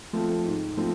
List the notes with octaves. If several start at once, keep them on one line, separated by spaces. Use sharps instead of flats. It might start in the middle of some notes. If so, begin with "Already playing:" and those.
F3 A3 C4
G#2
F3 A3 C4